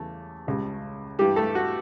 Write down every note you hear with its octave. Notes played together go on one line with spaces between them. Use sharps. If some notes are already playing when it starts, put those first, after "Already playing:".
Already playing: E2 C#3 G3 A3
C#2 C#3 G3
G2 E3 G3 G4
A3 A4
F#4